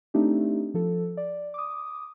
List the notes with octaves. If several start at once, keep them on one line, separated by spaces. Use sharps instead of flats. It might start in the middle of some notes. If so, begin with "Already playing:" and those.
A3 C4 D4 D#4 G4
F3 A4
D5
D6 D#6